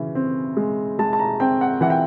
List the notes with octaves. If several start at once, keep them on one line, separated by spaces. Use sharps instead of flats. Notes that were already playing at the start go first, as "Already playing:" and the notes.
Already playing: C#3 E3
C4
G#3
G#3 A5
A5
A#5
C4 G5
F#5
E3 F#5
G5